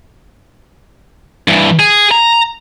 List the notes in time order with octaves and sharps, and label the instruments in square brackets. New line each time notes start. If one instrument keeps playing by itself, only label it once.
[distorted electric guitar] G2 E3
G#4
A#5